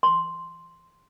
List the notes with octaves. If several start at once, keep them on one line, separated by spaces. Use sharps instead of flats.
C6